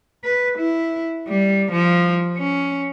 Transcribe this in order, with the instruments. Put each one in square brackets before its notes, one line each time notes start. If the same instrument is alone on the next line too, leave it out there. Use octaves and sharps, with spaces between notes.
[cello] B4
E4
G3
F3
C#4